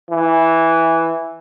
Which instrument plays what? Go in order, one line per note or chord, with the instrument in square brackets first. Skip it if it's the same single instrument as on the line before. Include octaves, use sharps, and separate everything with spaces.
[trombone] E3